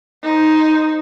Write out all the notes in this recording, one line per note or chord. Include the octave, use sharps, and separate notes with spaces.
D#4 C5